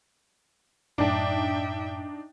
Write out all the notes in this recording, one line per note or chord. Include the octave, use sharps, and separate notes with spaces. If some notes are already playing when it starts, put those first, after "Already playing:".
F#2 A2 D4 D#4 E5 G5